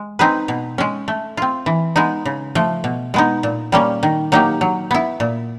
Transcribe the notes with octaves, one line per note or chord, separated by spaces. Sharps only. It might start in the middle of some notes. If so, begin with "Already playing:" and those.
Already playing: G#3
C4 D#4 G#4 B4
B2
G#3 C#4
A3
C4 F4
E3
G#3 B3 D#4
C#3
F3 A3
B2
G#3 B3 D#4
A#2
G3 A#3 C#4
D#3
F#3 A#3 D#4 G4
F#3
B3 E4
A#2